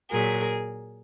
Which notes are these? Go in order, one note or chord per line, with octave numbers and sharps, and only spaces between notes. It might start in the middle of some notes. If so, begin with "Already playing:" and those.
A#2 F#3 G#4 A#4